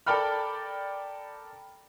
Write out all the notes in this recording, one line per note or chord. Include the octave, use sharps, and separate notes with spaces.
A4 A#4 D5 G5 B5 F6